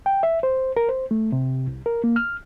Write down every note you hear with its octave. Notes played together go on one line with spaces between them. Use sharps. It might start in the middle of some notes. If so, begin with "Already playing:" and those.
G5
E5
C5
A#4
C5
A3
C3
C2
A#4
A#3
F6